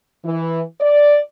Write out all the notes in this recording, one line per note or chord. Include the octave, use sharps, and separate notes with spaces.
E3
D5